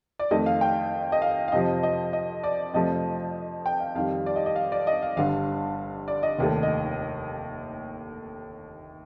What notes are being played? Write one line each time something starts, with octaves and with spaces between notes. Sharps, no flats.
D5
F2 D#3 A3 D#5
F5
G5
D#5
F5
F5
F2 C3 F3 D#5
D#5
D#5
D5
F2 C3 F3 A3 D#5
G5
F5
F2 D#3 G3 F5
D5
D#5
D#5
F5
D5
D#5
F5
G1 G2 D3 F5
D5
D#5
F1 D#2 D#3 A3
D#5